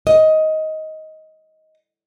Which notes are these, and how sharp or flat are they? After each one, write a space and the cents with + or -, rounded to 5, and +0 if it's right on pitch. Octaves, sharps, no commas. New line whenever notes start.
D#5 +15